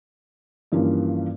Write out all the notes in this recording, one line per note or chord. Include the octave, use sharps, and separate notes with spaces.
G2 E3 F3 A#3 C#4